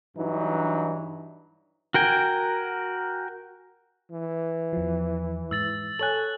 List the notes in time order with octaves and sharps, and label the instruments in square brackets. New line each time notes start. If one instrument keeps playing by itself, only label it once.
[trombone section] G2 E3 F#3 D4 D#4
[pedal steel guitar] F#4 A#4 G5 G#5
[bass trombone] E3
[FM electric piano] E2 F3
[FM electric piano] G#2 [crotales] E6 A6 F#7
[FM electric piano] A4 C#5 G#5 [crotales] F#6 F#7